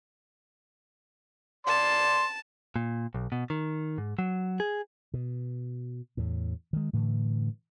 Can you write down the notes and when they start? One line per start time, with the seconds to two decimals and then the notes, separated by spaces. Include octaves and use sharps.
1.67 D5 A5 C6
2.76 A#2
3.15 B1
3.32 B2
3.50 D#3
3.98 G#2
4.19 F#3
4.60 G#4
5.14 B2
6.17 E2 A2
6.73 D#3 G#3
6.93 A2 D3 E3